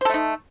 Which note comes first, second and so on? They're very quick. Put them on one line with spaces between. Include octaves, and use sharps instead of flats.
C5 A4 A3 D#4